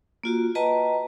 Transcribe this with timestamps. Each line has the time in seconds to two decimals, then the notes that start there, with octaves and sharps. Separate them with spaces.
0.23 A#3 F4 F#4
0.55 B4 D#5 G5 A5 A#5